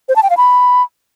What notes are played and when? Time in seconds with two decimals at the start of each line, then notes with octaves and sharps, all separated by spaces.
0.09 C5
0.16 A5
0.23 G5
0.30 F5
0.37 B5